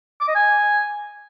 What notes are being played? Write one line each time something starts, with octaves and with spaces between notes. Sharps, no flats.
D6
D#5
G#5